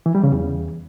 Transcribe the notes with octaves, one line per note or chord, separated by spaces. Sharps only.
E3
G3
C#3
E2